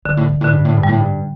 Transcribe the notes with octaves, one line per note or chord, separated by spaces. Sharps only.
G2 D3
A2
G2
A2 D3
G2
A2
G2
G3
A2
G2